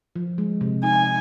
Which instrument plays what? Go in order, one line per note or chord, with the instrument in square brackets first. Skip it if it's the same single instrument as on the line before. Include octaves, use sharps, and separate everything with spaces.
[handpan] F3
G#3
C3
[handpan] D#4 [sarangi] G#5